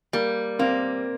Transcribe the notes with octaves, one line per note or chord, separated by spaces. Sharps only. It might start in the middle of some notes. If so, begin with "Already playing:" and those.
G3 A#3
A#3 C4